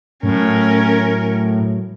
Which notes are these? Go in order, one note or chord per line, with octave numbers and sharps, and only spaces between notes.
A2 F#3 C#4 A#4